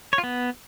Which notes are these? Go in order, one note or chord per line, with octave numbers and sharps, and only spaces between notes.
C#5
F4
B3